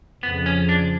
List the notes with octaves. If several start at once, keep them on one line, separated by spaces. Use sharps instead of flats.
F2 C#3 F3 B3
C#4
D4